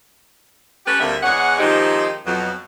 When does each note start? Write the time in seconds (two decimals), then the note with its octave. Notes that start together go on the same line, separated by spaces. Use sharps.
0.86 A3 C#4 G4 B4
1.00 D2 D3 G3 A#3 C4 E5
1.23 E2 G#3 G#4 C#5 F#5
1.58 D#3 F3 G#3 C4 D#4 G4
2.25 F2 B2 F#3